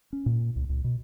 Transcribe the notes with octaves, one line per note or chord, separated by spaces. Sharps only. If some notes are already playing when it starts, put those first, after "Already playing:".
C#4
A#2
C#2
C#2
B2